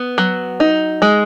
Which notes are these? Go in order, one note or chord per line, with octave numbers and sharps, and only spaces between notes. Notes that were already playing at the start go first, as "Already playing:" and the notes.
Already playing: B3
F#3
D#4
G#3